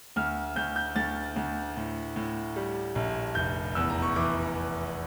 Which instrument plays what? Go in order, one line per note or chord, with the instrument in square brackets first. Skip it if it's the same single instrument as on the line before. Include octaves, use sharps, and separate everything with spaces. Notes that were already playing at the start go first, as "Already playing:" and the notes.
[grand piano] D2 F6
D2 G6
G6
D2 A6
D2
A2
A2
G3
A#1
F1 G6
E2 E6
A#5
C#6
E3 D6